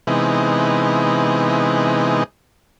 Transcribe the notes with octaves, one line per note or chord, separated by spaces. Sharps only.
C3 E3 G#3 B3 D#4